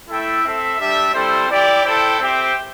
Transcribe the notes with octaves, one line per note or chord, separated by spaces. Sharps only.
A3 E4 A4 E5 G5
C4 A4 E5
G3 D4 G4 E5
G3 C4 E4 A4 C5
E4 G4 D5
E4 A4 C5 G5
C4 G4 C5 E5 G5